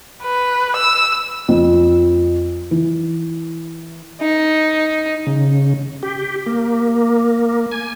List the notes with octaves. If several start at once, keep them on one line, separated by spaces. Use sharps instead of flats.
B4
E6
F2
E3
D#4
C#3
G4
A#3
G#5